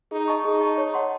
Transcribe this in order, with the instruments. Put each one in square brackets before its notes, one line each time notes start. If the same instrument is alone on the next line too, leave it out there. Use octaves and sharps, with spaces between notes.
[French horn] D#4 [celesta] G#4
[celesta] D#5 A5 C#6
[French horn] D#4 [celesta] G#4
[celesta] D#5 A5 C#6
C#5
F#5 A5 C6